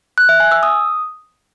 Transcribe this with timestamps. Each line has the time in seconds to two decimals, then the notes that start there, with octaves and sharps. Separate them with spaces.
0.18 F#6
0.29 E5
0.40 G#5
0.51 E6
0.63 D#6